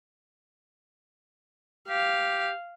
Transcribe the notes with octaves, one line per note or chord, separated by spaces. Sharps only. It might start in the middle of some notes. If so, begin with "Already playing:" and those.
G4 F5